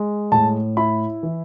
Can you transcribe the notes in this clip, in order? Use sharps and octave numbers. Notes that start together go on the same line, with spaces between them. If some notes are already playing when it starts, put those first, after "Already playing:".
Already playing: G#3
A2 A5
E4 B5
E3